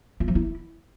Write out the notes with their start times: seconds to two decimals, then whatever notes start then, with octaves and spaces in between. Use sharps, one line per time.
0.20 F4
0.28 F3
0.35 E4